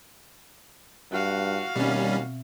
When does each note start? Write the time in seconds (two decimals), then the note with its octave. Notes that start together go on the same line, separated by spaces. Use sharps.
1.12 G2 F#4 F5 F6 F#6
1.76 D#2 B2 G3 C4 C#4 E5